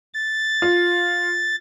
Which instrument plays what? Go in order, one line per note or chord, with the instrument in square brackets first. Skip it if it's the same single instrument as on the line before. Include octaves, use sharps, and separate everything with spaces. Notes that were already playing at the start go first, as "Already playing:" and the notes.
[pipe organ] A6
[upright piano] F4